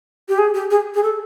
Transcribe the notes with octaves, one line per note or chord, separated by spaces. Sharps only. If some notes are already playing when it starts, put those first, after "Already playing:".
G4
G#4
G4
G#4
G#4
A4